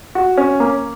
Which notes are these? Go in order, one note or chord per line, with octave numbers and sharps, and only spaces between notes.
F#4
C#4
A#3